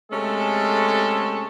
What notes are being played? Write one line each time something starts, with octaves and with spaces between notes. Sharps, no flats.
C3 G#3 A3 C#4 A4